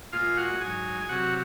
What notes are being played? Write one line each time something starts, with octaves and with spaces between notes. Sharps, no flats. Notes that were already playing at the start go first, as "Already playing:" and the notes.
A#2 G#3 F4 F5
F#4 F#5
G#2 F#3 G#4 G#5
G#5
C3 F#3 F#4 F#5